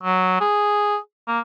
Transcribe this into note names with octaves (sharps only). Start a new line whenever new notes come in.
F#3
G#4
A#3